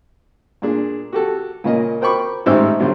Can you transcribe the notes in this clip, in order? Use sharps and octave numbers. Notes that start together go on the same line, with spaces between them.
A#2 D4 G#4
F#4 G4 A4
A#2 C#3 A#3 D#5
A#4 C5 G5 B5 C#6 D6
A1 G#2 D#4 G4 C5 E6
B1 D3 F#3 G3 C5